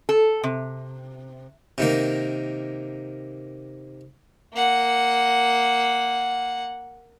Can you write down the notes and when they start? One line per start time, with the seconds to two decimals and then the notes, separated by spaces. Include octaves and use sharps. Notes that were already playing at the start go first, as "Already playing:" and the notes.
0.09 A4
0.44 C3
1.78 C3 D#3 A#3
4.54 A#3 F#5